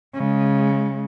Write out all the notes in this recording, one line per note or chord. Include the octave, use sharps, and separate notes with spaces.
C#3 G#3